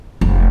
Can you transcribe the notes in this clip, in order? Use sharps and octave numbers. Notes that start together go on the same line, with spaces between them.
F1